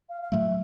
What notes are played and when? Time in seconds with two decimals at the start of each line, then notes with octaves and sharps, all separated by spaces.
0.09 F5
0.22 F5
0.32 A2 F#3 A3 E5